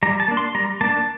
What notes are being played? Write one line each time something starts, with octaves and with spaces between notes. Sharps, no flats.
G3 A#5
A5
A#3 D4
C6
G3 A#5
A#3 D4 A5